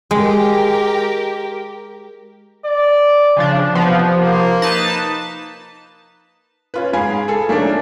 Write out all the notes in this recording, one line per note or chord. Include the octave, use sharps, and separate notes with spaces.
G#3 G4 A#4
D5
C#3 F3 D4
C3 F3 B3
A#3
D#4 B4 A5
C#4 F4 B4
G#2 G#4 F5 B5 G#6
G#4 A4
F3 A3 A#3 C#4 D4